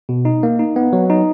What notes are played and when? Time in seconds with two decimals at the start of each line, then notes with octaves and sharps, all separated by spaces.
0.09 B2
0.25 D#4
0.43 A#3
0.59 D#4
0.76 B3
0.93 F#3
1.10 D#4